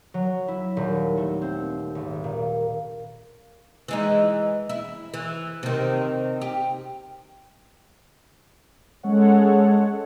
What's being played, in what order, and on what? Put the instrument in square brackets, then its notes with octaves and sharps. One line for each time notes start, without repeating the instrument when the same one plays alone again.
[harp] F#3
E4
D#1
A3
C4
G#1
A#2
[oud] E3 G#3 D#4
E4
E3
C3 D#3
G4
[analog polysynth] G#3 C#4 A4 C#5 F#5